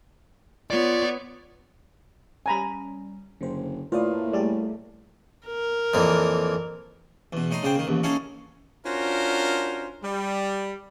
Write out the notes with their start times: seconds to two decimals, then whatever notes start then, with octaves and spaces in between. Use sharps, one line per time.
0.70 B3 F4 C#5 D5
2.46 G3 C#4 G#5 A#5 B5
3.41 F#1 D3 C5
3.92 A2 A3 A#3 F4 B4 D5 D#6
4.33 G3 G4 G#4 D5
5.47 A#4
5.94 F2 A#2 E3
7.33 E2 B2
7.51 A2 D#4 D#5 C6
7.63 C#3 D4 C5 G5
7.75 D#3 A#3
7.87 A1 D#2
8.03 A#3 C#4 D#4 E4 G#4 A4
8.86 C#4 D4 F4 F#4 A#4 C5
10.04 G3